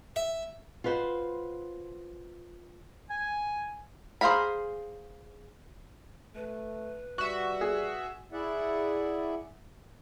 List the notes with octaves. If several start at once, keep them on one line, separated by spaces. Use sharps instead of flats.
E5
F4 F#4 B4 C5
G#5
G#4 C5 F5 A#5 B5
A3 B4
G3 F#4 E5 C#6
G#4
E4 G#4 D5 E5 F#5